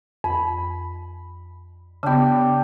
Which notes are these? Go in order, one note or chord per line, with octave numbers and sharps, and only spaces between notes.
F2 B5
C#3 B3 D4 G4